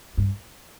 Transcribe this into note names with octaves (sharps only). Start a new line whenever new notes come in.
G2